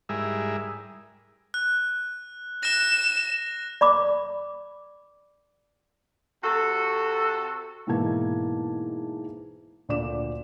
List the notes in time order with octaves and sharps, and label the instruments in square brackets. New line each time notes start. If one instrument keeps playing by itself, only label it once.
[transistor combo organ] G#2 G3 E4 G#4 A#4 E5
[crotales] F#6
[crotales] F#6 A#6 [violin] E7
[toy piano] D5 B5 D6
[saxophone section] C3 F#4 A4
[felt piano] G#2 B2 E3 A#3 A5 G#6
D2 A#2 D4 D5 D6 E7